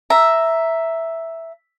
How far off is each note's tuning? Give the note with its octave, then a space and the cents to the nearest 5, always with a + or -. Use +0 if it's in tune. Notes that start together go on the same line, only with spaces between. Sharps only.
E5 +0 A#5 +0